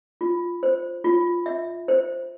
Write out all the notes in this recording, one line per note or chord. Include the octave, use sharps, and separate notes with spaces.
F4
C5
F4
E5
C5